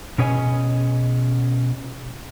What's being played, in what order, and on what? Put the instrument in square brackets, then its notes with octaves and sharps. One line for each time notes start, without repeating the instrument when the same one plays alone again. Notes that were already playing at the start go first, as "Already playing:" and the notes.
[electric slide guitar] B2 C#4 G#4 C#5 D#5 G#5